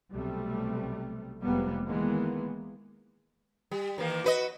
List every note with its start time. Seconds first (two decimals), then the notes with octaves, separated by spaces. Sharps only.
0.13 B1 C3 G3 A3
1.43 F1 C3 G3 G#3 A#3 B3
1.86 D#3 E3 G#3 A#3 B3
3.71 G3
3.98 D#3 E3 A#3
4.24 F#4 B4 D#5